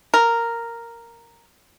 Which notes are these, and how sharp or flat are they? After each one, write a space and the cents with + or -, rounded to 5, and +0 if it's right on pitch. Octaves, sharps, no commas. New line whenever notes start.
A#4 -5